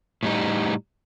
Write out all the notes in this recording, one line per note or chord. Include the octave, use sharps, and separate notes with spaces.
A2 G3 D#4